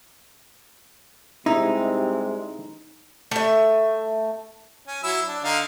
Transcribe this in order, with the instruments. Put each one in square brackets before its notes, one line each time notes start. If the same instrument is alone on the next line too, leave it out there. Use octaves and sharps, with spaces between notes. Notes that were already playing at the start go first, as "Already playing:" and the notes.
[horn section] C3 G3 G#3 [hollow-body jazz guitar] D#4 [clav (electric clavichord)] E4
[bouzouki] A3 E5
[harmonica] C#4
F#3 E4 E6
D4
D3 D#4 F5